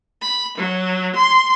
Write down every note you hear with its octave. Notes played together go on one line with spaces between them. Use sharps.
B5
F#3
C6